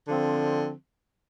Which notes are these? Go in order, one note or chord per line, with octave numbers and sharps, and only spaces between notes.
D3 F3 C4